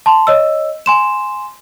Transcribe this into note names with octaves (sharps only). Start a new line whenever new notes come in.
A5 C6
C#5 D#5 E6
G#5 C6 E7